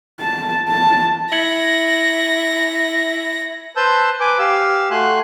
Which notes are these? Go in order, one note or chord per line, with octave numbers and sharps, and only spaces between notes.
A5
A5
E4 G#6 A#6 C#7 F#7
B4 C5 A5 E6 G6
B4 G#5 D6
G4 F5 E6
A3 F#4 G#5 C6 F#6